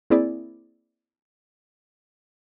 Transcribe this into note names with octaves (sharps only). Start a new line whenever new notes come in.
A#3 C4 E4 G#4 D5